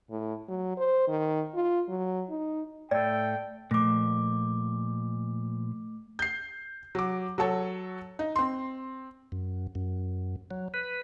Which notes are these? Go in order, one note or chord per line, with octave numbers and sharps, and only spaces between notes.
A2
F#3
C5
D#3
F4
F#3
D#4
A2 A3 D5 G5
A#2 F3 A3 D6
G6 C7
F#3 D6
F#3 F#4 A4 C#5
D#4
C4 C6
F#2
F#2
F#3
B4